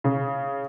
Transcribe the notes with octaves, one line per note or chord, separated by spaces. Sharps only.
C#3